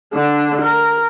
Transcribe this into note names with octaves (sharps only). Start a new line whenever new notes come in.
D3 D4
A#4